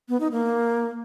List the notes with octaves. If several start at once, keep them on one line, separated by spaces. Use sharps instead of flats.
B3
D#4
A#3